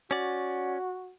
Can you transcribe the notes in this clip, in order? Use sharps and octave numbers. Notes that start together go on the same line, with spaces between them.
C#4 F#4 D5